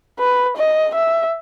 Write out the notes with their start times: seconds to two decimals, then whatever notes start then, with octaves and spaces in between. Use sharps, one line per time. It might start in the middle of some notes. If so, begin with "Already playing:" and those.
0.19 B4
0.57 D#5
0.95 E5